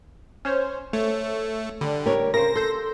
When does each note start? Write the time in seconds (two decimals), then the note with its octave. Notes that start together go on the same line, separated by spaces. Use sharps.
0.45 C#4 C5 C#5
0.93 A3 C#5
1.81 D3 G3
2.06 G4 A#4 C#5
2.34 C#3 A#4 C5 A#6
2.56 A4 C6 E6 G6